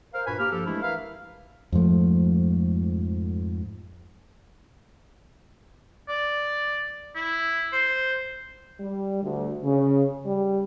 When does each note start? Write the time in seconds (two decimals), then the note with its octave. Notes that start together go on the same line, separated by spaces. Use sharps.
0.14 A#4 C5 F5
0.26 G2 A#2 F#4 B4 G#5 B5
0.39 A#3 G4 F6
0.51 G2 F3 G4 A4
0.66 E3 G#3 A3 D4 E4
0.82 A#4 B4 E5 F5
1.72 F2 G#2 F3 A3
6.09 D5
7.15 E4
7.73 C5
8.80 G3
9.23 D2
9.63 C#3
10.26 G3